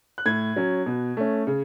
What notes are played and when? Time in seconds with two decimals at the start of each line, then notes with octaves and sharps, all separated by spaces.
0.18 F#6
0.26 A2 G#6
0.56 F#3 C#4
0.86 B2
1.17 A3 C#4
1.47 C#3